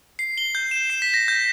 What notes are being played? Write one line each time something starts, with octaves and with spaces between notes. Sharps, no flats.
C7
G7
G6
E7
C7
B6
A#6
G6